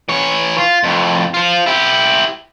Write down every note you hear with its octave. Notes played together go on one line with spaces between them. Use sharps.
E3 C#5
F4
F2 A2
F4 C5
E4 G4